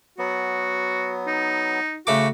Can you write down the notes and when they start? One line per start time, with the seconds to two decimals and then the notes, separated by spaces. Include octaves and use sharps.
0.18 F#3 B3 F#4
1.27 D#4
2.07 C#3 A3 F#4 D6